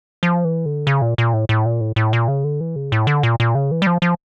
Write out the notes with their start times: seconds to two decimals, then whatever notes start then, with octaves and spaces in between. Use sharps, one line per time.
0.23 F3
0.45 E3
0.66 D3
0.87 C#3
1.02 A#2
1.18 A#2
1.33 A2
1.49 A2
1.66 A#2
1.81 A2
1.96 A2
2.13 A#2
2.28 C#3
2.44 D3
2.60 E3
2.76 C#3
2.92 A2
3.07 D3
3.23 A#2
3.40 A#2
3.55 C#3
3.71 E3
3.82 G3
3.87 F3
4.02 F3